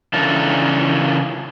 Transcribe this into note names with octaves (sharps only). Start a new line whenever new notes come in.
C#3 E3 D4 F4 A4 A#4